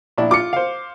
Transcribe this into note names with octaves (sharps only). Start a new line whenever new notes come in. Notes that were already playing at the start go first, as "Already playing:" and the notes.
A#1 D4 E4
F4 D6 C#7
C5 F5